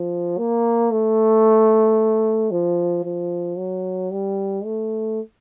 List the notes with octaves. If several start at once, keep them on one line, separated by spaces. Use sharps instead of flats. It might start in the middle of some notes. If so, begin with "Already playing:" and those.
Already playing: F3
A#3
A3
F3
F3
F#3
G3
A3